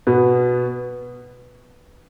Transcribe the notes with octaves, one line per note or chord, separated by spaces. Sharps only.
B2 B3